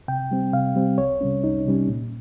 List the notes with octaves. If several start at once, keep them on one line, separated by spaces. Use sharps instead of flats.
C3 G5
G3 C4
C3 F5
G3 C4
C2 C#5
C3 G3 C#4
C2 D#4
C3 G3 C#4
A#2